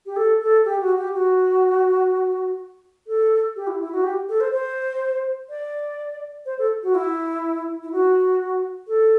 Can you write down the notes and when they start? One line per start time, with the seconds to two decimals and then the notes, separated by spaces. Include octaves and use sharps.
0.06 G4
0.16 A4
0.40 A4
0.65 G4
0.80 F#4
0.97 G4
1.13 F#4
3.07 A4
3.56 G4
3.67 E4
3.80 E4
3.92 F#4
4.03 G4
4.29 A4
4.40 C5
4.52 C5
5.49 D5
6.45 C5
6.58 A4
6.83 F#4
6.95 E4
7.83 E4
7.92 F#4
8.88 A4